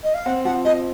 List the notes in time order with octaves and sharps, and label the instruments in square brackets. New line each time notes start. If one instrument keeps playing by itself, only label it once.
[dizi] D#5
F5
[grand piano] C4 [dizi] F#5
[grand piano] F3 [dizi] F#5
[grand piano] F3 [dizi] D#5